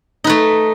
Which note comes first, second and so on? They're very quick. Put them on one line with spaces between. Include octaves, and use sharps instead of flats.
D#4 B4 A3